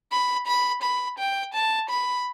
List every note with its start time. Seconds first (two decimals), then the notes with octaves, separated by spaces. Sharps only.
0.11 B5
0.47 B5
0.83 B5
1.18 G5
1.54 A5
1.89 B5